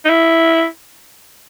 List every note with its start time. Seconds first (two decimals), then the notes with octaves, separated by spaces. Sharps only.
0.05 D#4
0.09 E4